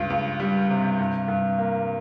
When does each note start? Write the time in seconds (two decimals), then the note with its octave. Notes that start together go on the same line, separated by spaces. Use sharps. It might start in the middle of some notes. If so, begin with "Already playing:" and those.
Already playing: C#2 G2
0.10 C#2
0.40 G3
0.70 C3
0.99 G2
1.28 G2
1.58 A#3